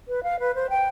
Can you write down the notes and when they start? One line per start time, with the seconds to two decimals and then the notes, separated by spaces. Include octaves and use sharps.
0.08 B4
0.23 F5
0.40 B4
0.55 C5
0.70 G5